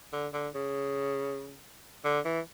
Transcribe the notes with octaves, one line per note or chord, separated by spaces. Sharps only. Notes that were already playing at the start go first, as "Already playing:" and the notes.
D3
D3
C#3
D3
E3